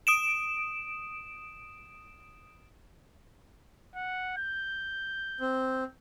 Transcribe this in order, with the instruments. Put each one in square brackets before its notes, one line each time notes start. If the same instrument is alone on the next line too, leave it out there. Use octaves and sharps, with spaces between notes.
[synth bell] D#6 D7 E7
[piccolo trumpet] F#5
G6
[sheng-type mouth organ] C4